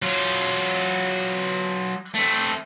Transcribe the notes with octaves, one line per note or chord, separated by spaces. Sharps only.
F#3 F4
A3 C4